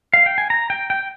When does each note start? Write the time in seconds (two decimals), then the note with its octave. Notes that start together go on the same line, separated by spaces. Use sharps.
0.14 F5
0.26 G5
0.38 G#5
0.50 A#5
0.70 G5
0.90 G5